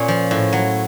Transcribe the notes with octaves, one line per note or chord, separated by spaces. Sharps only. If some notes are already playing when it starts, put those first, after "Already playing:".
Already playing: A#2 C#4
F3
A2
F#3